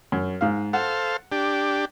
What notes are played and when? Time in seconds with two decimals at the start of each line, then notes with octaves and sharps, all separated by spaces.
0.12 F#2
0.41 G#2 F5
0.73 A4 C5 F5 F#5
1.32 D4 G4